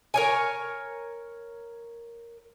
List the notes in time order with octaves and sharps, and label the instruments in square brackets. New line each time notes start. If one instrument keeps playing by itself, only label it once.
[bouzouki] A#4 C#5 G#5